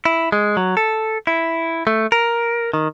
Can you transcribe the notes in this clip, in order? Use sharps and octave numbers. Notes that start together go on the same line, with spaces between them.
E4
G#3
F#3
A4
E4
A3
A#4
D#3